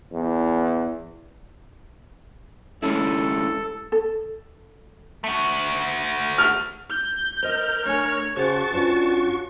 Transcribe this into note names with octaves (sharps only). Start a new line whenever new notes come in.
E2
G#3 C#4 E4 A4
A4
A3 F#4
F6
G6
A#4 C5 D#5 F6
A3 D4 C#5 G#5
C#3 F#4 G#4 C5 A5 C#6 A6
G2 C#4 D4 F4 A#4